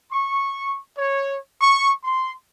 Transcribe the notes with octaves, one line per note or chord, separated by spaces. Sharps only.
C#6
C#5
C#6
C6